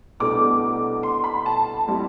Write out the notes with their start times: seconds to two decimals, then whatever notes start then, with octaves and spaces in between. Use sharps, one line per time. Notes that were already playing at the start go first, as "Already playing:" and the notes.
0.20 C2 B2 A3 D4 D6
1.03 C6
1.24 B5
1.46 A5
1.87 A2 G3 C4 E4